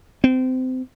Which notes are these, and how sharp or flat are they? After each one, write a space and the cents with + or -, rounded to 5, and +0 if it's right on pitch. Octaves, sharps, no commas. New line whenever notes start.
C4 -25